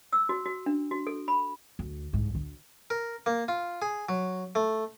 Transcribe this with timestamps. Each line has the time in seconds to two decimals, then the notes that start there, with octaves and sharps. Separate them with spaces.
0.13 E6
0.29 F#4
0.46 F#4
0.66 D4
0.91 F#4
1.07 A4
1.28 B5
1.79 D2
2.13 C2 G#2
2.35 D2 D3
2.90 A#4
3.26 A#3
3.48 F4
3.82 G#4
4.09 F#3
4.55 A3